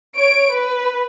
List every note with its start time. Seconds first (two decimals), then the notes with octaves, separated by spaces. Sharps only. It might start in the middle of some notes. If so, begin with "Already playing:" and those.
0.17 C#5 D7
0.52 B4